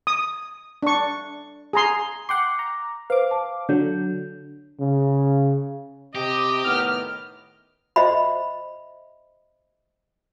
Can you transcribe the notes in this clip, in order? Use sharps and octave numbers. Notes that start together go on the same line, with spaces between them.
D#6
D4 C#6
G#4 A#5 C6
F#5 G5 C6 D6
A#5
B4 C5 F5 D6
A5
D3 F#3 G6
C#3
C3 G4 D#5 D6
A2 D#3 B3 F6
C5 D#5 E5 B5